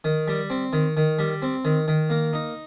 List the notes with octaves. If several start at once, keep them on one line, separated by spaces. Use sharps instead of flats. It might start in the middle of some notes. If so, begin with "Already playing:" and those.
D#3
G3
C4
D#3
D#3
G3
C4
D#3
D#3
A#3
D#4